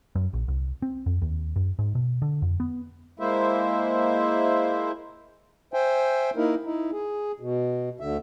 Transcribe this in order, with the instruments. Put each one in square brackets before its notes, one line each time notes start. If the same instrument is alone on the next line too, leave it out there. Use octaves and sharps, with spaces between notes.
[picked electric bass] F#2
A#1
C2
C4
F2
D#2
F#2
G#2
B2
D3
F2
B3
[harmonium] G#3 A#3 E4 C5 E5
C5 E5 G5 G#5
A#3 D#4 E4 A#4
D#4 E4
G#4
B2
D2 D3 E5